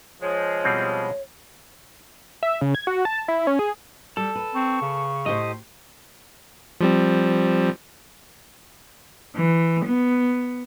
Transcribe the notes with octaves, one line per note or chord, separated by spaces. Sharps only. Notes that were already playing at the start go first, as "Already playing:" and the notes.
F3 G#3 C#5
B2 G3 C4
E5
C#3
G#6
F#4
A5
E4
C#4
G#4
G3 A4
B4
C4 C#6
C#3
A2 G4 C5 D#5
F3 G3 C4
E3
B3